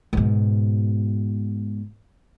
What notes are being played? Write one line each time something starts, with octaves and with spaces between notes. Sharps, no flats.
G#2 B2